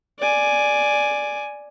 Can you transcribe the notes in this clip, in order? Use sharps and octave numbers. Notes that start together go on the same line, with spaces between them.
D5 G#5